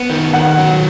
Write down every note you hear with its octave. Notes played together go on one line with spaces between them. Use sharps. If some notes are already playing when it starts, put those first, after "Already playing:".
Already playing: B3
D#3
D#3 F#5
F#3